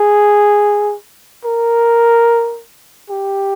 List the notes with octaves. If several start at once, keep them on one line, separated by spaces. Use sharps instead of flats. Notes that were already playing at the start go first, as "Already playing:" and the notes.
Already playing: G#4
A#4
G4